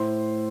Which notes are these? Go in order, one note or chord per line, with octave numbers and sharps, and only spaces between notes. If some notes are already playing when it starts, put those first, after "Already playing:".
Already playing: A2 C5 C6